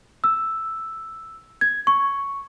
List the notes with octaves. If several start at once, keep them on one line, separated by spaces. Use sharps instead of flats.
E6
G#6
C#6